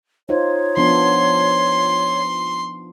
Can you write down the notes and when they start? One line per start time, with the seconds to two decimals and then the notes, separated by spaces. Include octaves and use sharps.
0.29 D#4 F4 C5 C#5
0.77 F3 B3 D4 C6